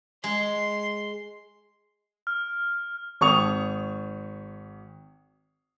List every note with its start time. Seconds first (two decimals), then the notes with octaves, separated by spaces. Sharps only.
0.24 G#3 C6
2.27 F6
3.21 G#1 C#6 D#6 F7